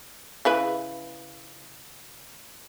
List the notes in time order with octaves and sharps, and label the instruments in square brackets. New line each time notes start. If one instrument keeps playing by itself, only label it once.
[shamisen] C#3 E4 B4